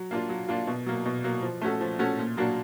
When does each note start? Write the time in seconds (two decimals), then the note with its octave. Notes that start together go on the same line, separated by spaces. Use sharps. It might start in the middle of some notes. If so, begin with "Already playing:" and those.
Already playing: F#3
0.11 A#3 D4 F4
0.29 F#3
0.48 A#3 D4 F4
0.67 B2
0.86 F#3 A#3
1.06 B2
1.24 F#3 A#3
1.42 F3
1.61 A3 C#4 F#4 A4
1.81 F3
1.99 A3 C#4 F#4 A4
2.18 A#2
2.37 F#3 A#3 D4 F#4